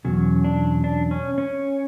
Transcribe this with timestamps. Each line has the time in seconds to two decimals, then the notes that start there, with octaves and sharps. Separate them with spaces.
0.04 E2 B2 F#3 C#4
0.44 D4
0.84 D4
1.11 C#4
1.38 C#4